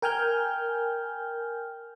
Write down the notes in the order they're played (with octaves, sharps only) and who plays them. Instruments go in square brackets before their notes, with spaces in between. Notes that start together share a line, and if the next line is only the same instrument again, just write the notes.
[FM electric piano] A#4 G5 G#5 F6 G6